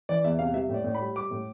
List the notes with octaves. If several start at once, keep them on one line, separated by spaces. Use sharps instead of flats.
E3 D5
E2 E5
C3 F5
G3 E5
A2
D5
A2
B5
G3
G3 D6
A2